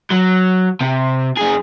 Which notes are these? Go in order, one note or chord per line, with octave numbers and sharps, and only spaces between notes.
F#3
C3
F#2 G#4